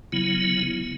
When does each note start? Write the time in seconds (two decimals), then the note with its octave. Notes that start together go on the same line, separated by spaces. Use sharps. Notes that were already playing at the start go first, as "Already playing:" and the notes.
0.12 C#3 F#3 B3 E4